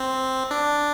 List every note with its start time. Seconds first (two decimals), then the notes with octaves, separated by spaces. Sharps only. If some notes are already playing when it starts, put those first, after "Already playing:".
Already playing: C4
0.51 D4